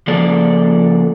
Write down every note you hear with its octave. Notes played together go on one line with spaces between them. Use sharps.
C#3 F3 A#3 A4 D5